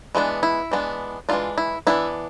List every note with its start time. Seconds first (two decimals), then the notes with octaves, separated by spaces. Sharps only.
0.15 E3 G#3 B3 D4
0.43 E4
0.71 E3 G#3 B3 D4
1.29 E3 G#3 B3 D4 F4
1.58 E4
1.87 E3 G#3 B3 D4 E4